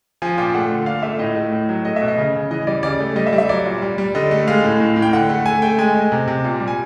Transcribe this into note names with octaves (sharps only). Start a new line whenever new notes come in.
F3 G#5
A#2 G5
A3 F#5
D3
A#2 F5
A3 E5
A2 D#5
A3
A2
F#3
A3 D#5
E5
B2
D#5
C#3
C#3
E3 D#5
G3 D5
C#3 D5
A3
G3 D#5
E5
G3
E5
F#3 D5
A#2
G3
G3
D3 D#5
A3
G#3 F5
A2
A2
A2
G5
D3 F#5
A3
A3 G#5
A3 G5
G#3 G#5
G#3
C3
C3
A#2
G3
G#5